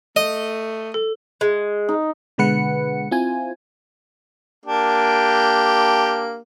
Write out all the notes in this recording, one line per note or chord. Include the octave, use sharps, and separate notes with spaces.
A3 D#5
A4
G#3
D#4
B2 D3 G#3 B4 F#5 C#7
C4 E4 F4 G#5
A#3 D4 G4